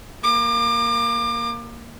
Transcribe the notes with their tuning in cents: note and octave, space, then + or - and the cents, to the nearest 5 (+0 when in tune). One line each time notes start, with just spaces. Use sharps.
A#3 +0 D6 +30